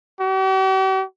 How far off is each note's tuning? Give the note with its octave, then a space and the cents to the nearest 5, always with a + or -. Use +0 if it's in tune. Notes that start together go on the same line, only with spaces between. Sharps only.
G4 -45